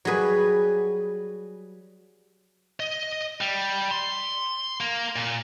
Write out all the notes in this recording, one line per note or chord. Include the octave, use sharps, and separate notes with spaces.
F#3 G3 G#4 B4
D#5
G3
C6
A#3
A#2